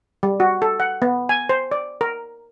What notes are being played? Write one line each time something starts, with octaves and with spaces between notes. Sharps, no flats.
G3
F#4
A4
F#5
B3
G#5
C5
D5
A#4